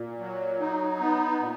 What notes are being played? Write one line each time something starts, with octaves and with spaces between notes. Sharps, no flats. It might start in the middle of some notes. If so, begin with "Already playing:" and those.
Already playing: A#2
F#3
D#4
B3
A#2